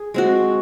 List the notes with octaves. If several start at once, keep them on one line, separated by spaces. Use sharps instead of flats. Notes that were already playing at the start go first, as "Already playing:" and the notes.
Already playing: G#4
G#3 C4 F#4